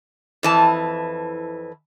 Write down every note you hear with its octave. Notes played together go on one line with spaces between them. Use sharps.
F2 E3 A5